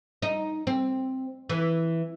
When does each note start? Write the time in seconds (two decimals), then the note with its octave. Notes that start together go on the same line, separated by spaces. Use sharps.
0.22 D#4
0.67 C4
1.49 E3